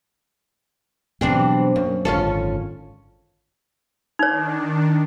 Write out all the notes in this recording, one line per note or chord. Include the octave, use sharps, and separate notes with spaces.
B2 E3 F#3 G3 C4 D4
F#2 A#3
G#1 F#2 D3 C#4 F4 A4
D#3 D4 D#4 C#5